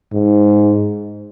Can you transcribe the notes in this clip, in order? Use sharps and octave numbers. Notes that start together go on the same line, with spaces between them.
G#2